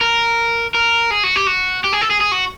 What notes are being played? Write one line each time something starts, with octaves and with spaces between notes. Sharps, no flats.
A#4
A#4
G#4
F#4
G4
F#4
G4
G#4
A4
G#4
G#4
F#4